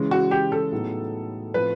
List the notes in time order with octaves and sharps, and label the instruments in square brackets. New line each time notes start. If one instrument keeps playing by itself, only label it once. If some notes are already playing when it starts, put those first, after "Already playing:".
Already playing: [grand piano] C#3 E3 G#3 C#4
[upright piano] F#4
G4
A4
[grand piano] A2 F#3 B3 D#4 G#4
[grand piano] A2 F3 A3 C4 [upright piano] B4